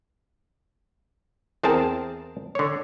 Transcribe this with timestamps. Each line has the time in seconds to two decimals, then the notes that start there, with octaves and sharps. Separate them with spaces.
1.63 E2 C4 G#4 A#4 A5
2.55 D3 C#5